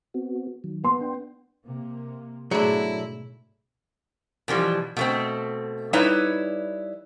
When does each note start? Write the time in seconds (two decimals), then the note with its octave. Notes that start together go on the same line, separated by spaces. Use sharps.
0.14 B3 C4 F#4
0.64 D#3 F#3
0.84 B3 C6
1.01 D4 G5
1.66 C3 A#3
2.51 G#2 B2 D3 F#3 A3 E4 G#4
4.48 B2 E3 F3 G3
4.97 B2 A3 C4
5.93 G3 D#4 E4 B4 C#5